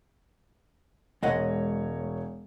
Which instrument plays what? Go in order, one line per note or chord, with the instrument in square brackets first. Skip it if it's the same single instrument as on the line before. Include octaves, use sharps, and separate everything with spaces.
[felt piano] E1 C#5 [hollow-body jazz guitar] G#3 D#5 F#5